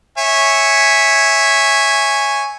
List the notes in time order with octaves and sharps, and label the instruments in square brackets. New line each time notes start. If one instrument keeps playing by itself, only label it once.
[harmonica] C#5 E5 G#5